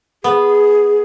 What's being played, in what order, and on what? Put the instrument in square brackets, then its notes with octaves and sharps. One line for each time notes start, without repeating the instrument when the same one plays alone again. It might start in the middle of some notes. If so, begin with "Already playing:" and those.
[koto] B3 [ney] G#4